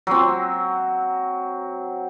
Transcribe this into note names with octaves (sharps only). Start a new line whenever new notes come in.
F#3 C4